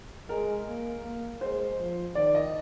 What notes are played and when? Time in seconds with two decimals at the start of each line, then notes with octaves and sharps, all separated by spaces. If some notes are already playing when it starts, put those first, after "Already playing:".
0.29 G#3 A#4
0.67 A#3
1.04 A#3
1.41 G#3 C5
1.78 F3
2.15 D#3 D5
2.35 D#5